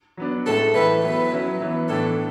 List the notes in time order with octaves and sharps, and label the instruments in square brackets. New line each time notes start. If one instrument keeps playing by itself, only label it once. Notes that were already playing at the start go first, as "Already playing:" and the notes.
[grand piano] F#3 B3 D4
[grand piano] A2 G#3 C#4 E4 [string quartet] A4
[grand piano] A2 E3 A3 E4 [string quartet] B4
[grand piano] F#3 B3 E4 [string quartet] B4
[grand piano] F#3 C#4 E4
E3 B3 E4
[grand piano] A2 E3 B3 D4 [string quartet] A4